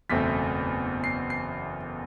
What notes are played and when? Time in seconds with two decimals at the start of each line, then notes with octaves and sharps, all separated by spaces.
0.10 F#1 E2 B2 A3 C4 B6
1.04 C7
1.30 C7